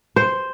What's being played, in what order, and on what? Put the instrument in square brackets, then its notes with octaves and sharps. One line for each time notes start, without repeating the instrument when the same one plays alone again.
[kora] C5